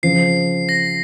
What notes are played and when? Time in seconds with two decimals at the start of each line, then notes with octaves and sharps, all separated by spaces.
0.03 C#3 F3 C4 F4 C7
0.69 A#6